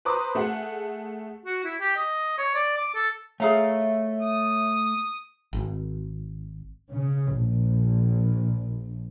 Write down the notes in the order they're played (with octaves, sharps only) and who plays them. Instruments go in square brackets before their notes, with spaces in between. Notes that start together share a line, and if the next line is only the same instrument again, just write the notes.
[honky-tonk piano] B4 C5 A#5 D6 D#6
A3 G#4 F#5
[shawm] F#4
E4
G4
D#5
C#5
D5
D6
A4
[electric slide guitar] A3 [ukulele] G#4 F5 A#5 [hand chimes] C#5 E5
[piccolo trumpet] D#6
[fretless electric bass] G#1
[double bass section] C#3
A#1